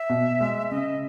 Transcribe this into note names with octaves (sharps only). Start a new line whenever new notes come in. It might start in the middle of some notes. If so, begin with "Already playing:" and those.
Already playing: E5
B2
G#3
C#3 D#5